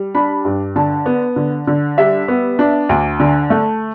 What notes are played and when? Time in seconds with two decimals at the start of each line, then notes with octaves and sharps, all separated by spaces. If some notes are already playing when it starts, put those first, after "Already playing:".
Already playing: G3
0.15 D4 B5
0.45 G2
0.76 D3 A5
1.06 B3
1.36 D3
1.67 D3
1.98 G3 E5
2.28 B3
2.59 D4
2.89 D2
3.20 D3
3.50 A3